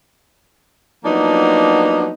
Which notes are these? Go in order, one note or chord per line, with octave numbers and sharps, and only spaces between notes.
F3 F#3 A#3 B3 D4 D#4